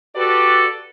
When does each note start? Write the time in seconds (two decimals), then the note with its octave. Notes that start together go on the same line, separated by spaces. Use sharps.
0.16 F#4 G4 A4 B4 D5